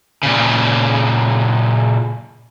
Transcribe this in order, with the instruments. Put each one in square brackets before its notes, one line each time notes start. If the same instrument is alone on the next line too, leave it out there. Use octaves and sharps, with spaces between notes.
[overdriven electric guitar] A#2 C#3